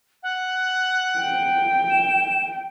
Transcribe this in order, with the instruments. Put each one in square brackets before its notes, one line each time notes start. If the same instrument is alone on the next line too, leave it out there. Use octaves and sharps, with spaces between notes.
[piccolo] F#5
[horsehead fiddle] G5
[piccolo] E7